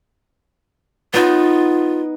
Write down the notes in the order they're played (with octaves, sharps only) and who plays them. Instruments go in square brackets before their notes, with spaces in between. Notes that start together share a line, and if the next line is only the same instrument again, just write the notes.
[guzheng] B3 D#4 [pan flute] F4